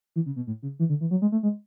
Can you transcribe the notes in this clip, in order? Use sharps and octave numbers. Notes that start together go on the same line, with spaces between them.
E3
C#3
B2
A2
C#3
E3
D3
E3
F#3
G#3
A3
G#3